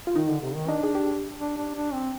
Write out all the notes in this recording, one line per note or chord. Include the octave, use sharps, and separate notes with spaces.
F4
D#3 D#4
D3
C3
D#3
D4 D#4
G#4
G4
D4
D4
D4
C4